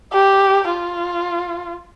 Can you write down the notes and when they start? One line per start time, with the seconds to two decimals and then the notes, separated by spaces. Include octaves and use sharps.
0.13 G4
0.69 F4